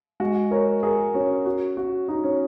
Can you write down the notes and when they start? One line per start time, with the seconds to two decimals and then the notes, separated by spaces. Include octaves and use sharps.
0.20 G#3 F#4
0.51 A#4 C#5
0.83 G#4 A#4
1.14 C#4 F#4
1.46 F#4
1.77 F#4
2.08 D#4 F#4
2.24 C#4